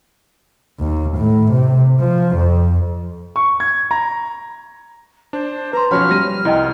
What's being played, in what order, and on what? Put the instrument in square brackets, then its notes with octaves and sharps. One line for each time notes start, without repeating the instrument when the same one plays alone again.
[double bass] D#2
A2
C3
F3
F2
[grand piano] C#6
G#6
A#5
[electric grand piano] D4 [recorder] C5
[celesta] B4 C6 [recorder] A#5
[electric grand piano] B1 C#5 B5 [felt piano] F3 C#4 F#4 [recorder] F6
[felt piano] G3 [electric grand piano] A#6 D#7
[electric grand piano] C2 [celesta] E4 D#5 G5 [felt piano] A#5